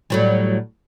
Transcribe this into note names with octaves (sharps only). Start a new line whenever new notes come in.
A2 F#3 G3